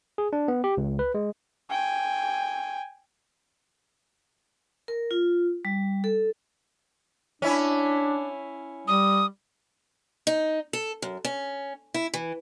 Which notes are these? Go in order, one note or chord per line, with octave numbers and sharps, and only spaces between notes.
G#4
D4
B3
G4
C#2
B4
G#3
G5 G#5
A#4
F4
G3
A4
C#4 D4 E4
G3 D#6
D#4
A4
F#2
C#4
E4
E3